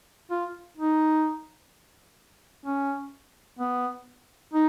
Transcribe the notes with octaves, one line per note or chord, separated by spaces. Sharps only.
F4
D#4
C#4
B3
D#4